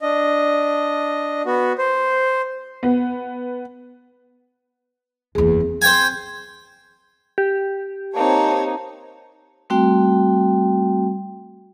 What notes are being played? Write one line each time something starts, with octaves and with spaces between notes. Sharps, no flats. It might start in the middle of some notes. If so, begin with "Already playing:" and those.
D4 D#5
B3 F#4
C5
B3
F#1 E2 G#4
C4
C5 G5 G#5
G4
A#3 C4 D#4 C#5 A5
G3 A3 C4 F#4 G5